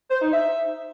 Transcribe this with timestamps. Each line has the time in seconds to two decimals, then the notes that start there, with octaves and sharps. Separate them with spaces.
0.09 C5
0.21 D#4
0.32 E5